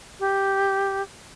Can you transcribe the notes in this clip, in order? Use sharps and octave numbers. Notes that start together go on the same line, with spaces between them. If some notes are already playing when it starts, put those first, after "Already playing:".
G4